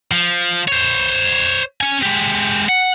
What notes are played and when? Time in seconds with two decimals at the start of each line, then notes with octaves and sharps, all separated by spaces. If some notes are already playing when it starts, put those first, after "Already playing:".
0.12 F3
0.68 C5 C#5
1.81 C#4 G#5
2.03 G#3 G4
2.69 F#5